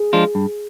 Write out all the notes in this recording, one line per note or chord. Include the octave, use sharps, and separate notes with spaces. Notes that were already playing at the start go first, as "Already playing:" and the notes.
Already playing: G#4
F3 G#3 D4 F4
G2